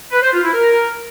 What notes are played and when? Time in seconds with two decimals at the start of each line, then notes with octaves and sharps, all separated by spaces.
0.12 B4
0.22 C5
0.33 F4
0.43 E4
0.54 A#4